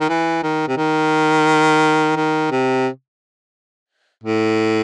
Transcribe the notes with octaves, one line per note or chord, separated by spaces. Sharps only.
D#3
E3
D#3
C3
D#3
D#3
C3
A2